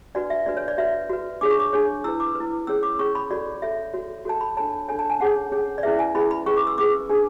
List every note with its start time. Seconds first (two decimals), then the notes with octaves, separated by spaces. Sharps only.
0.15 D4 F#4 B4 D5
0.30 E5
0.46 D4 F#4 B4 D5
0.57 C#5
0.68 D5
0.78 F#4 B4 E5
1.09 F#4 B4
1.41 D4 G#4 C#5 D6
1.50 C#6
1.60 D6
1.73 D4 G#4 C#5
2.04 E4 B4 E6
2.20 D6
2.35 E4 B4
2.67 C#4 G#4 C#5 E6
2.83 D6
2.99 C#4 G#4 C#5 C#6
3.15 B5
3.30 F#4 A4 C#5 D5
3.62 F#4 A4 C#5 E5
3.94 F#4 A4 C#5
4.25 F#4 A4 C#5 A5
4.41 B5
4.57 D4 A4 C#5 A5
4.88 D4 A4 C#5 G#5
4.99 A5
5.10 G#5
5.20 C#4 G#4 C#5 F#5
5.52 C#4 G#4 C#5
5.78 D5
5.83 C#4 E4 G#4 B4 E5
5.99 G#5
6.15 C#4 E4 G#4 B4 B5
6.31 B5
6.46 C#4 G#4 B4 C#6
6.57 D6
6.67 E6
6.78 C#4 G#4 B4 D6
7.09 D4 G#4 B4